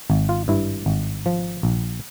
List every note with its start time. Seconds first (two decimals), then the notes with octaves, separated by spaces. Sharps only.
0.10 G#1
0.29 F4
0.48 G2 E4
0.86 G#1
1.26 F3
1.63 A#1